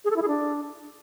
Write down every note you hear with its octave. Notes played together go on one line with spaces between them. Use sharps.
G#4
A4
E4
G#4
D4